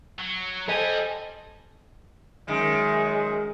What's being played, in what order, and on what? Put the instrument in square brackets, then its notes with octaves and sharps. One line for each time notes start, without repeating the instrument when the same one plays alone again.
[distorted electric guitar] F#3
[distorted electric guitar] G3 [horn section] A4 C5 G#5 [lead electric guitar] D#5
[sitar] F#2 D#3 [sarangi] G#3